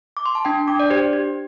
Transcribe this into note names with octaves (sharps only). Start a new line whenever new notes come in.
D6
C6
A5
D4 G5
D4 D6
D5
G4 C5
G4